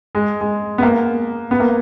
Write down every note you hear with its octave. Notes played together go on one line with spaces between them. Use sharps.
G#3
G#3
B3
A#3
B3
A#3